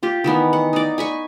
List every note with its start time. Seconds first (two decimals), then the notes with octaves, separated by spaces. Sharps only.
0.03 F4 G4
0.24 D#3 E3 B3
0.53 F#5
0.73 D#4 D5
0.98 G#5 B5 C#6